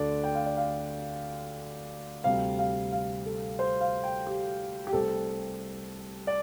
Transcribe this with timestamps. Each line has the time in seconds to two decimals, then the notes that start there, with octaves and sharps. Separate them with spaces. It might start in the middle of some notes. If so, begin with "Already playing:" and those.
Already playing: D2 D3 A3 D4 D5
0.24 G5
0.35 F5
0.46 D5
0.57 F5
2.24 D2 C3 G3 C4 F5
2.59 F5
2.92 F5
3.26 A4
3.59 C5
3.81 F5
4.04 G5
4.27 G4
4.87 G4
4.93 C2 C3 A3 C4 A4
6.27 D5